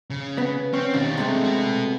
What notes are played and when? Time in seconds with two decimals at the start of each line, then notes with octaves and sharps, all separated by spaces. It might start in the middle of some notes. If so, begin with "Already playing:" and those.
0.10 C#3
0.38 B3
0.74 C4 C#4
0.94 D#2 B2 D4
1.18 C3 G#3 A3
1.44 F#4 B4